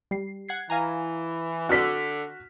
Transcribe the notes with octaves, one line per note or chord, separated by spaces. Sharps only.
G3 C7
F#5 G#6 C7
E3 F5 G#5 A#5
D3 F#4 F6 B6